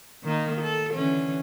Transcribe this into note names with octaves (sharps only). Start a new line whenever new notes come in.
D#3 A#3 D#4
A4
D3 E3 C#4